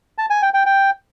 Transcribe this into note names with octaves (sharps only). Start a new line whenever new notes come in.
A5
G#5
G5
G5
G5